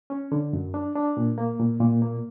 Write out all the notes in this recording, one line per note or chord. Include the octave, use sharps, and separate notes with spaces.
C#4
D3
F#2
D4
D4
A#2
A#3
A#2
A#2
A#3